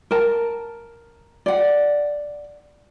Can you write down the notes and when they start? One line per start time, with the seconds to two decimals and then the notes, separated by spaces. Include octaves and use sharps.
0.11 A#4 A5
1.46 D5 F#5